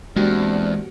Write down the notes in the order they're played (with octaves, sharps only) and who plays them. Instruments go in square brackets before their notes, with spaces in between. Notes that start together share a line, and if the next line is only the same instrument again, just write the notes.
[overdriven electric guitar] E2 [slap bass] G#3 [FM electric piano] A#3 F#4 G4 [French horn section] C4 D4